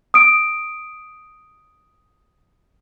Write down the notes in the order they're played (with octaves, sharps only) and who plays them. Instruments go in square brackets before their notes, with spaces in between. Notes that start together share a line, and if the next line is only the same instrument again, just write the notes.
[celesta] D#6 D7